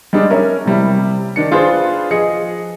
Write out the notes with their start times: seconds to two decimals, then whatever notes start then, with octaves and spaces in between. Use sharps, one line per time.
0.13 G3 G#3 D4 D#4
0.30 C#4 A#4 E5
0.65 C3 G3 E4
1.36 D#3 D4 C#7
1.51 D4 F4 G#4 B4 C5
2.11 F3 G#4 D#5 C#7